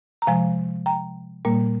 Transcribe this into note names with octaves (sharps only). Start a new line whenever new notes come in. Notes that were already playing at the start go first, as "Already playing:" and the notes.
A#5
C3 F3 G#3 F5 G#5
G5 A#5
A#2 G3 A#3